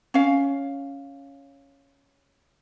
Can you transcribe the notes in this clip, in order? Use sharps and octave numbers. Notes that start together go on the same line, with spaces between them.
C#4 F5